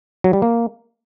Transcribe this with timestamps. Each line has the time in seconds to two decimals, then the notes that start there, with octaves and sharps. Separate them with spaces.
0.24 F#3
0.33 G3
0.42 A#3